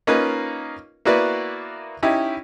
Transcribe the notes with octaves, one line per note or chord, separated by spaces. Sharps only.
A#3 C#4 D#4 F4 A#4 B4
A#3 B3 E4 F#4 B4 D5
C#4 D#4 E4 G4